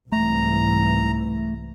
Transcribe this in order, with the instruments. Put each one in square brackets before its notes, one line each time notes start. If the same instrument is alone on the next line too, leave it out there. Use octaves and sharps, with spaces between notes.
[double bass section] C2 G#2 E3 [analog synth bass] A3 [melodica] A#5